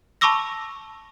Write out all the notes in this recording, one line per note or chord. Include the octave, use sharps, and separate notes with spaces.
A5 B5 C#6 D6 E6 A#6